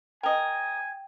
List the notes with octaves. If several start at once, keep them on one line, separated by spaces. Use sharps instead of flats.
A#4 D#5 G5 G#5